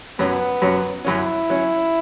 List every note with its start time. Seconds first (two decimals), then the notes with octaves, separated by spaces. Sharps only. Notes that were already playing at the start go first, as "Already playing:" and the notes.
0.19 F#2 F#3 B3 C#4
0.62 F#2 F#3 C#4
1.05 F#2 F#3 C#4 E4
1.50 F#3 C#4